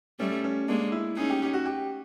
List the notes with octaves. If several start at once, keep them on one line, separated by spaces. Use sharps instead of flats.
G3 A3 C#4
C#4
G#3 A#3 D4
E4
C#4 D#4 G#4
G4
G4
F#4
G4